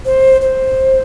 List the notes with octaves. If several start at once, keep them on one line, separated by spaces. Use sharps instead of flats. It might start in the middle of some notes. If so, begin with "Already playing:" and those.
C5
C5